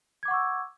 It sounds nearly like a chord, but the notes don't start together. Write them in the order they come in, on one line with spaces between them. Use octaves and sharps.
G#6 D6 F#5 C#6 E6